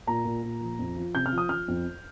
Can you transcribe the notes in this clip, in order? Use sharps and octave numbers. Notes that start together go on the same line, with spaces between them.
A#2 A#5
A#2
A#2
F3
F2
F3
C3 G6
F6
F3
D#6
F3 F6
F2